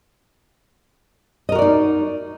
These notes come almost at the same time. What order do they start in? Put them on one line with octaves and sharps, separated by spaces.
D#5 A#4 F#4 D5 D#4